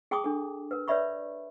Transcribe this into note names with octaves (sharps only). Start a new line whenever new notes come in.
G#4 G5 A5 C6 D6 D#6
D4 A4
A#4 B4
B4 C#5 D5 E5 B5 C#6